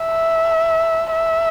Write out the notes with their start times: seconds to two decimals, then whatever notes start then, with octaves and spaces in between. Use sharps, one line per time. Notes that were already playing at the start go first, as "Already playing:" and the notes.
Already playing: E5
1.12 E5